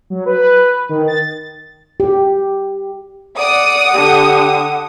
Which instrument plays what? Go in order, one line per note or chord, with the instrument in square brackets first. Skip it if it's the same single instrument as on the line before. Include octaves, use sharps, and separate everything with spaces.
[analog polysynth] F#3
B4
D#3
A6
[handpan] G4
[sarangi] D5 [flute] F#5 [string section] D#6
[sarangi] D3 [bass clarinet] G4